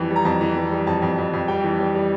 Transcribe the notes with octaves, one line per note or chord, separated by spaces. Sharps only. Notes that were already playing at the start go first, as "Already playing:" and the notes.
Already playing: F2 E3 G3
G3
A#5
F2 A5
E3
G3
G3
F2 A5
F2
F2
F2
G3 G5
E3
G3
G3